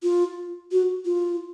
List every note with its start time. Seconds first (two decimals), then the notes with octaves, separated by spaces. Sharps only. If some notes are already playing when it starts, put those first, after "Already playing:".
0.03 F4
0.72 F#4
1.05 F4